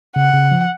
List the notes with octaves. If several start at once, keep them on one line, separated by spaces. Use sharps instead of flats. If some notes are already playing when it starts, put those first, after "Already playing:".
C#3 F#5
C#3
F3